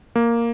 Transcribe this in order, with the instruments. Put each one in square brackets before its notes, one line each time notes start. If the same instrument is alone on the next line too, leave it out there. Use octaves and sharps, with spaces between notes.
[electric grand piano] A#3